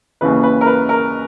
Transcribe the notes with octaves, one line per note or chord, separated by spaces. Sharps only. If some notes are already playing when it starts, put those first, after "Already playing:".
D#2 C#3 E3 B4
B4
A#4
B4
A#4